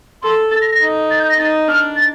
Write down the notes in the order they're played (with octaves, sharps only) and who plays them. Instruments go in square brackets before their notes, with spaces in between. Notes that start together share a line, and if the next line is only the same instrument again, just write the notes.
[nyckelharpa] A4 [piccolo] C6
[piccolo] A6
A#6
A#6
[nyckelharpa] D#4
[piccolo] A6
G6
A#6
[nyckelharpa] D#4 [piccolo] A6
[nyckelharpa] D4 [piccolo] F6
[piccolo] A6